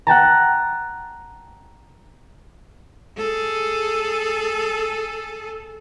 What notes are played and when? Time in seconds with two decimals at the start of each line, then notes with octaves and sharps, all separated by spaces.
0.07 F#5 G5 A5 A#5
3.17 G#4 A4